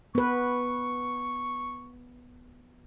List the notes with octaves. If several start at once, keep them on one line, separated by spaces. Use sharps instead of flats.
B3 B4 C#6